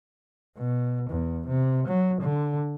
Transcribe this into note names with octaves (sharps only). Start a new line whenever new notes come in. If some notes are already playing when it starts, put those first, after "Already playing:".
B2
E2
C3
F#3
D3